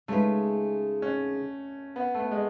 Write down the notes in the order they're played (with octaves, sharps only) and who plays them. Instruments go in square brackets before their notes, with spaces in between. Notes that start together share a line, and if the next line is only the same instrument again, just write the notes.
[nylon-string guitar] C#3 G#3 D#4 G#4 B4 [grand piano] A3
[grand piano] C#4
B3
A3
B3
G#3